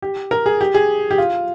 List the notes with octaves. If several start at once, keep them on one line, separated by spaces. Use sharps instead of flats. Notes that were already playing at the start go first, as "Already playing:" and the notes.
G4
A#4
G#4
G4
G#4
G4
F4